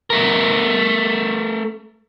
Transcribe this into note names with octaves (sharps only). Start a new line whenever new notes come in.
A3 A#4